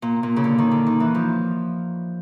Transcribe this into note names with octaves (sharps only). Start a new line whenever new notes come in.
A#2
A#2
C#3
D3
D#3
D3
D#3
E3
F3